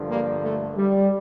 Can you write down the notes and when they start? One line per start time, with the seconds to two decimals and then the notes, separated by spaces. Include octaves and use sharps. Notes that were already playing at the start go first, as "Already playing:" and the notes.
Already playing: G2 D3 F3
0.09 G3 A#3
0.43 A3
0.77 G3